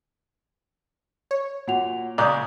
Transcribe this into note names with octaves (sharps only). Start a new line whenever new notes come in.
C#5
A#2 F#4 F#5 F7
A#2 C#3 G#3 D5 A#5 D#6 F#6 G6